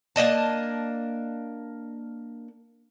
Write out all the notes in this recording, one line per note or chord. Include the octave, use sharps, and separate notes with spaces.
A#3 D4 D#5 A5